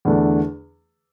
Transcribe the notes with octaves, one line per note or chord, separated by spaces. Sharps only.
E2 D3 A3 D4